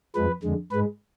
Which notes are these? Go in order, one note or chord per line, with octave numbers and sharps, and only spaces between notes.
F2 F3 G#3 B4
F2 D3 G#3
G#2 G#3 B4